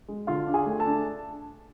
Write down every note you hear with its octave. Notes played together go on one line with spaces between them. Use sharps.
G#3
D3 F4 F5
D4
G#4 G#5
A3
A4 A5
D4